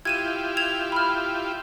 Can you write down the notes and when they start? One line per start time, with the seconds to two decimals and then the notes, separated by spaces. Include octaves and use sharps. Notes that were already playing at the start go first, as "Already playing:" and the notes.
0.05 E4 F4 G4 G#6 D#7 E7
0.57 G#6 E7 F7
0.92 B5 F6